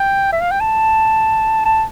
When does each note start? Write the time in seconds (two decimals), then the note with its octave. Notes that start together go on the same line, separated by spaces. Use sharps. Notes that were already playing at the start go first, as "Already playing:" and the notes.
Already playing: G5
0.32 E5
0.41 F5
0.51 G5
0.60 A5
1.65 A5